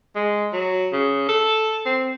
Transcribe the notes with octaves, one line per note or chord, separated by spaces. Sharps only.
G#3
F#3
C#3
A4
C4